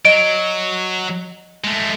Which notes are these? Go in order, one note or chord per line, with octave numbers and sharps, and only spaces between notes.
F#3 D#5 D7
G#3 A3